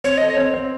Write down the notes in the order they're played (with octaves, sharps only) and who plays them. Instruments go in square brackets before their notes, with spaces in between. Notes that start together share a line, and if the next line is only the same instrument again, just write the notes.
[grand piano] C4 [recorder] C#5
[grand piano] A4 [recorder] D#5
[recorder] C#5
[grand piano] C4
C4